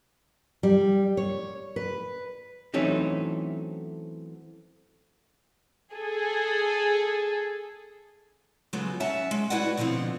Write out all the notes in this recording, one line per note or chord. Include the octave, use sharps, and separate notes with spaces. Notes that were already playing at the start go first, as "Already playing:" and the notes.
G3
C#5
B4
E3 F#3 A3 C4 C#4 D#4
G#4 A4
C#3 F3 F#3 G#3 B3 A4
F#3 C#4 E5 F#5 A5
G#3
E4 F#4 B4 C#5 D5 F#5
B2 D3 F3 B3 C4